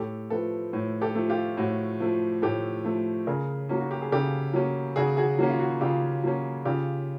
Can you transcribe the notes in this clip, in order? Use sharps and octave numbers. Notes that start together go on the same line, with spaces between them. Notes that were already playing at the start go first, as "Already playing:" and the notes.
Already playing: A2 G4 A4
F3 A3 A4 B4
A2
G4 A4
F3 A3
F4 G4
A2 F#4
F3 A3
A2 G4 A4
F3 A3
C#3 G#4 A#4
F#3 A#3 C#4
F#4
G4
G#4
C#3 G4 A4
F#3 A#3 C#4
C#3 F#4 G#4
F#4 G#4
F#3 A#3 C#4
F4
F#4
C#3 F4 G4
F#3 A#3 C#4
C#3 F4 G4